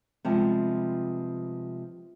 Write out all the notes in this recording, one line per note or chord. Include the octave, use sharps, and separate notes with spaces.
C3 F3 G3 G#3 B3